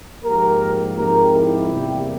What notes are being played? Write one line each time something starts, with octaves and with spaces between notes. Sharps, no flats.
G#2 F3 A#3 G4 A#4
G#2 F3 C4 G4 A#4
E4 G4
E2 C3 G3 A#3